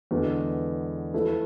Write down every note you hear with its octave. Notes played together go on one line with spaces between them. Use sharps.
E2 D3 G#3 B3
F3 A3 E4 B4